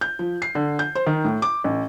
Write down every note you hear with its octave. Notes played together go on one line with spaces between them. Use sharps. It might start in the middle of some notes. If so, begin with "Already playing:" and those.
G6
F3
C7
D3
G6
C5
D#3
A2
D6
A1